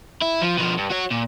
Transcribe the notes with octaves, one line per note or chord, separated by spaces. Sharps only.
E4
F3
B2 F3
G2
F#4 C#5
A#2